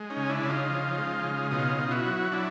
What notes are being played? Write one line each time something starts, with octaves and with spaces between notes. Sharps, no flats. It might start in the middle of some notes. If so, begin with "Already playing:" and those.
Already playing: G#3
C#4 D#4
C#3
D4 E4
C#3
D#4 F4
F3
G#3
C#3
B2 D#4 F4
B2
F4
E4 F#4
F#3
F#3 D4 E4